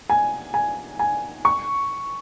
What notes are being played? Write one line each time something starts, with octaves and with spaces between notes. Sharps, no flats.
G#5
G#5
G#5
C#6